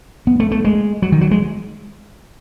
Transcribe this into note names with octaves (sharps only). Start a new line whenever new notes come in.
B3
A3
A3
G#3
F#3
D#3
F#3
G#3